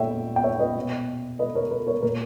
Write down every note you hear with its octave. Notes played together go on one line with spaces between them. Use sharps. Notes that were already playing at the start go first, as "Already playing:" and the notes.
Already playing: A#2 C#5 E5 G5
G5
C#5 E5
B4 D#5
B2
B4 D#5
A#4 C#5
B4
A#4 C#5
A#2 A#4